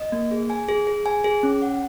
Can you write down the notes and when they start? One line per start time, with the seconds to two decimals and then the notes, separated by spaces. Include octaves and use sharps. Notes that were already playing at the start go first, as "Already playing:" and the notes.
Already playing: D#5
0.12 A#3
0.31 G#4
0.50 G#5
0.69 G#4
0.87 G#4
1.06 G#5
1.24 G#4
1.43 C#4
1.62 F#5